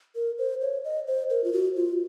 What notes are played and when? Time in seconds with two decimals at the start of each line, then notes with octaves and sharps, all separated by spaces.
0.15 A#4
0.38 C5
0.61 C#5
0.84 D#5
1.07 C5
1.30 A#4
1.44 F4
1.53 F#4
1.76 F4